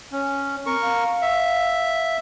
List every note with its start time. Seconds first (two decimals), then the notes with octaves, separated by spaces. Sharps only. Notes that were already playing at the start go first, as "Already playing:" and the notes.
0.12 C#4
0.66 C4 A#4 C#6
0.81 F5
1.22 E5